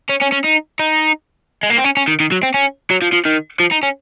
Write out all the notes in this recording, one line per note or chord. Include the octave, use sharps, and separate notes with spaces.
C#4
C#4
C#4
D#4
D#4
G#3
A#3
C4
C#4
C#4
D#3
D#3
F#3
C4
C#4
F#3
F3
F3
D#3
F3
D#4
C#4